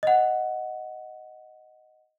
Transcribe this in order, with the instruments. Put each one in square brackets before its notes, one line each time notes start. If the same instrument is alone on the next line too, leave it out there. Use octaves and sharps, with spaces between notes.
[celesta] D#5 F#5